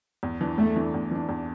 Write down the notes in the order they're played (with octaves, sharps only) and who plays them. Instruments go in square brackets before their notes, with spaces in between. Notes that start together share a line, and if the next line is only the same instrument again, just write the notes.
[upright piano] E2
E3 D4
[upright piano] E2 [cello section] A3
[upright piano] E3 D4
E2
E3 D4
E2